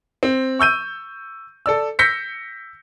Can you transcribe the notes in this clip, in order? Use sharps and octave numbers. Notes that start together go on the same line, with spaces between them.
C4
C#6 E6 G6 D#7
A4 D5 E6
E6 G6 A#6 B6 C#7